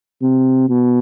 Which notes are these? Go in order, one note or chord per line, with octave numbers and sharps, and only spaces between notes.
C3
B2